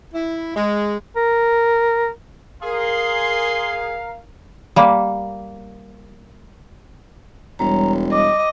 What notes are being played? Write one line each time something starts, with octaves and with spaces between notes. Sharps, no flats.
E4
G#3
A#4
G#4 A#4 F5 C6
G3 A#3
E1 G3 C#5 A#5
D#5 D6